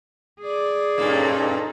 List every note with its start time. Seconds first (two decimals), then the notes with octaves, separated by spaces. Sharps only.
0.41 G#4 D5
0.98 G2 A#2 A#3 C#4 D#4 A4